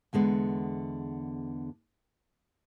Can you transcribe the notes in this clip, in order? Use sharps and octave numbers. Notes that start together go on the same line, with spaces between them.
E2 D3 G#3 B3